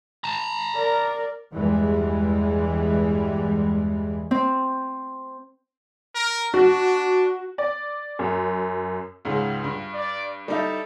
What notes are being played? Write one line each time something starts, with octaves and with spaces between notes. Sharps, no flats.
A5 A#5
A#4 D5
E2 G2 E3 G3 G#3
C4
A#4
D4 F#4
D5
F#2
C#2 G#2 C#3
G2
D5
G3 D#4 E4 A4